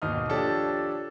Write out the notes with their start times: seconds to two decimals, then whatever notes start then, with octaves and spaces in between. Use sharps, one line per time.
0.02 G#1 D#2 B2 D#4 D#6 F6
0.29 F3 D4 G4 A4 C#5